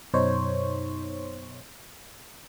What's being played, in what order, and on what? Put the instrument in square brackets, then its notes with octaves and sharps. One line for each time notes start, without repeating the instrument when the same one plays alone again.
[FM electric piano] F#2 B2 D#4 C5 C#5